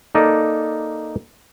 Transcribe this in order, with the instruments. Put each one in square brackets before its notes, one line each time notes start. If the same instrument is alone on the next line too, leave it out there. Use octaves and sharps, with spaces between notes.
[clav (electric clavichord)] A#3 D#4 A4 D5